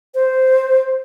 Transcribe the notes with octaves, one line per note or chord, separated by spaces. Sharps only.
C5